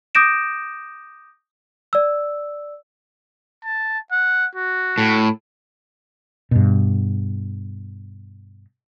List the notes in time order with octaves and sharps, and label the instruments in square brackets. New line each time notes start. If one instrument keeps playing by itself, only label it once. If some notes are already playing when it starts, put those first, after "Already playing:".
[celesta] D6 D#6 G6 A#6 D7 E7
D5 E6
[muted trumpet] A5
F#5
F#4
[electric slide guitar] A2
[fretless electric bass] G2 B2